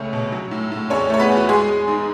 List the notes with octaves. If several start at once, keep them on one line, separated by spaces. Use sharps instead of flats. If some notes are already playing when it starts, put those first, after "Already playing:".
Already playing: C#2 A3 C#4 C#5
B2
F#3
A2
A2
E2 C#4 C#5
A3 C#5
B3 B4
E2
F#4
G#3 G#4
G#3
G#2